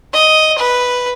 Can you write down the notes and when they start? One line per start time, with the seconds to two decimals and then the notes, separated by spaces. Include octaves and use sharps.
0.13 D#5
0.58 B4